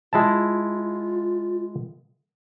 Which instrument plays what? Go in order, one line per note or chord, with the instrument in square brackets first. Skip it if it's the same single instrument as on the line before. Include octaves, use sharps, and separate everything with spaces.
[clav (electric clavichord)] G#3 E4 A5 [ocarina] F4